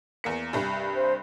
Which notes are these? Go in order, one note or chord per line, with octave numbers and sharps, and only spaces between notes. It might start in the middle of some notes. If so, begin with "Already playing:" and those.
E2 A#3 C#7
C2 G2
C5